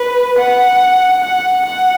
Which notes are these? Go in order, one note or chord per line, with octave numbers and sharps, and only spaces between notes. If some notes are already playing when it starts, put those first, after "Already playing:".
Already playing: B4
F#5
F#5
F#5